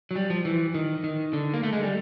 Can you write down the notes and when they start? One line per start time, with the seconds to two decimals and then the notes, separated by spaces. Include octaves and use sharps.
0.11 F#3
0.16 G3
0.30 F3
0.45 E3
0.75 D#3
1.04 D#3
1.33 D3
1.54 A#3
1.63 A3
1.73 G#3
1.83 G3